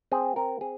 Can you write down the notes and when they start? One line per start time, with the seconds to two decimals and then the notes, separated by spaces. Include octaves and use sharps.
0.12 C4 G#4
0.36 C4 A#4
0.61 C4 G#4